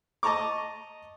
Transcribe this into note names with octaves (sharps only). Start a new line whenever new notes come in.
D#5 A5 A#5 C#6 D6